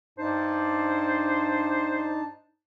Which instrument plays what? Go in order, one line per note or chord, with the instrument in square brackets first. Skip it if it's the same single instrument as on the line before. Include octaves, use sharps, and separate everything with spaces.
[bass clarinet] G2 [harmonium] D4 D#4 A5 [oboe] C5